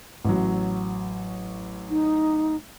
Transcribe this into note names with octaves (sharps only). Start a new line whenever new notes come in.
A1 F#3
D#4